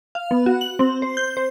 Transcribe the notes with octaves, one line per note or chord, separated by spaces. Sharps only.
F5
B3
F#4
F#7
C4
C5
G6
C5